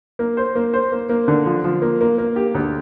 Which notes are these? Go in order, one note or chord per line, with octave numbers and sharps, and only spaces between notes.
A#3
C5
A#3
C5
A#3
A#3
D3
F3
F3
A#3
A#3
A#3
G4
D2